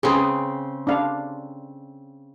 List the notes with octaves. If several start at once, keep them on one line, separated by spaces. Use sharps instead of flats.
C#3 C4 G#4 B4
D4 F5